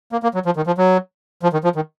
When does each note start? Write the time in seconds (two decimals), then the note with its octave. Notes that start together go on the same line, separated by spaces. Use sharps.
0.12 A#3
0.23 A#3
0.34 F#3
0.46 F3
0.57 D#3
0.67 F3
0.78 F#3
1.43 F3
1.53 D#3
1.64 F3
1.76 D#3